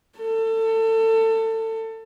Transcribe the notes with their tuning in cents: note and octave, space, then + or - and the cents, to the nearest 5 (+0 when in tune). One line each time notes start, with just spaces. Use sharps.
A4 +25